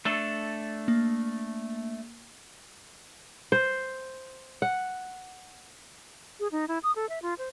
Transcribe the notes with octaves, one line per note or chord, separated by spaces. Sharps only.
A3 D4 A4
A#3
C5
F#5
G#4
D#4
E4
D#6
A4
E5
F4
C5